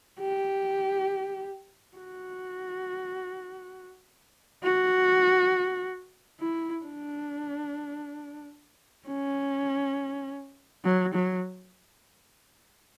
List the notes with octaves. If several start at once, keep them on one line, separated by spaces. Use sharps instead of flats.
G4
F#4
F#4
E4
D4
C#4
F#3
F#3